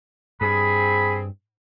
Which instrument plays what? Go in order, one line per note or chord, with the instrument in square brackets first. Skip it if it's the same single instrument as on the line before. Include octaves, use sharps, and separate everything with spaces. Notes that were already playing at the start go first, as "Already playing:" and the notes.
[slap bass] G2 [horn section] C4 G#4 [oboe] B5